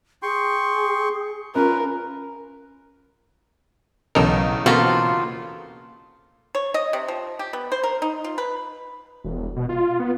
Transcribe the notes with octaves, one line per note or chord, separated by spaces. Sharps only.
G#4 G5 C6 C#6
C#4 F4 A#4 B4
B1 E2 C#3 A4 A#4 D#5
B2 A#3 C4 F4 F#4 A4 B5
C#5
D#5
C3
F3
G4
B3
C5
A#4
D#4
F4
B4
E1
B2
F4
B3